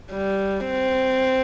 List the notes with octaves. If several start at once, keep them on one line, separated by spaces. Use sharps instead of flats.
G3
C4